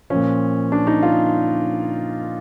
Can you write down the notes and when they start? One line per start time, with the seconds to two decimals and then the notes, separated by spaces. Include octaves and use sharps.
0.10 A#2 F3 C#4
0.72 D4
0.87 D#4
1.03 F4